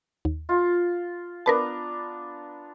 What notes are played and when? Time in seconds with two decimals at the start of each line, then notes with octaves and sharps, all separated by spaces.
0.25 D#2
0.49 F4
1.46 B3 D4 A#4 B4 A5 A#5